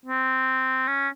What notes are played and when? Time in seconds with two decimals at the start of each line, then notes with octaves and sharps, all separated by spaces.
0.06 C4
0.87 C#4